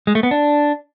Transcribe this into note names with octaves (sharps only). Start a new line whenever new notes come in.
G#3
A3
B3
D4